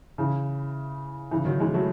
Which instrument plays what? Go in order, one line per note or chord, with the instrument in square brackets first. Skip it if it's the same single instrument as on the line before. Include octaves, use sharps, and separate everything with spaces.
[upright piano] C#3 E3
C#3 E3
D#3 F#3
E3 G#3
F#3 A3